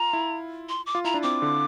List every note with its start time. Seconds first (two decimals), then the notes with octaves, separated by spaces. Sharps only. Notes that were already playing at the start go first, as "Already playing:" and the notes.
Already playing: F4 A#5
0.13 E4
0.69 C6
0.86 D6
0.95 F4
1.05 E4 A#5
1.14 D4
1.23 C4 D6
1.42 D3